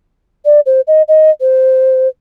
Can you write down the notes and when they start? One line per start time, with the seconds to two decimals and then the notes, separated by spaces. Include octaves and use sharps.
0.45 D5
0.66 C5
0.87 D#5
1.08 D#5
1.41 C5